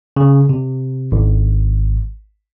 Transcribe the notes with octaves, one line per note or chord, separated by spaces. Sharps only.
C#3
C3
G#1